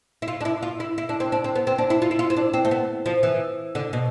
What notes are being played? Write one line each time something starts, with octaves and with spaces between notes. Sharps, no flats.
E4
F4
D4
E4
F4
E4
E4
D4
C4
D4
C4
B3
C4
D4
E4
F4
E4
F4
C4
D4
C4
A3
B3
F3
E3
D3
B2